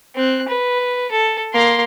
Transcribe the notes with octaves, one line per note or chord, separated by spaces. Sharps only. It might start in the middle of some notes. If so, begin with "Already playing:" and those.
C4 F#6
B4
A4
A#3 C6